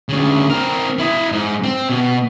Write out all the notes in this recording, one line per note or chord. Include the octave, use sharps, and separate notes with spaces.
D2 C#3
C4 A#4
E4 D#5
G#2
C4
B2